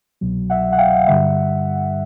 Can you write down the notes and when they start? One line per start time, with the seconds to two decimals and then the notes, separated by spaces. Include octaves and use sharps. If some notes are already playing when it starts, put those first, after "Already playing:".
0.21 C2 B2 F#3
0.50 E5 F#5
0.72 F#5
0.78 F5 G5
1.07 G2 D3 G3 E5 F#5